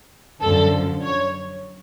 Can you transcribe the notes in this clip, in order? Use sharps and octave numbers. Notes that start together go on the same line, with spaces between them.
F#2 D3 F3 A4
C#5